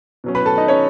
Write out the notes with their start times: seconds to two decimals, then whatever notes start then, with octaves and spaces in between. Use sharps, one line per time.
0.24 B2 F#3 C#4
0.35 B4 B5
0.46 A4 A5
0.57 D#4 D#5
0.68 C#4 C#5